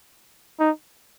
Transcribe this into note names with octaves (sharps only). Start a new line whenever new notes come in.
D#4